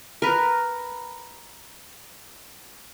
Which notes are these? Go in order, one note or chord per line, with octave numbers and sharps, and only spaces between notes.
A#4 B4